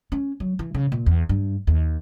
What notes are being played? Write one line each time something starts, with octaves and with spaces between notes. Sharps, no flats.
C#4
F#3
E3
C#3
A#2
E2
G2
D#2